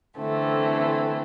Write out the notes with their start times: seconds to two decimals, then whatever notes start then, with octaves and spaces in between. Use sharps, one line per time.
0.18 D3 E3 A3 C4